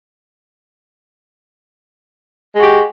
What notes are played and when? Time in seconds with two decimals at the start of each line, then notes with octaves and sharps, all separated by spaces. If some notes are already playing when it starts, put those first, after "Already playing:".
2.54 G#3
2.57 F#4
2.61 G4